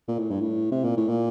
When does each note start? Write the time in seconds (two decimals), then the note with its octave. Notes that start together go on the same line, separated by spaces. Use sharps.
0.08 A#2
0.19 A2
0.31 G2
0.41 A2
0.72 C3
0.84 A#2
0.97 A2
1.09 A#2